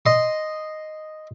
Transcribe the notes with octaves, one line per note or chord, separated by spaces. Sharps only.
D#5 C6